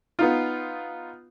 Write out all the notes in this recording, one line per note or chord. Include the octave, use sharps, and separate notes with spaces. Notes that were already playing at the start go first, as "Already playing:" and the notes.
B3 D#4 F4